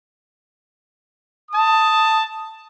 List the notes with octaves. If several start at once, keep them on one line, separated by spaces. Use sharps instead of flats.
A5 D#6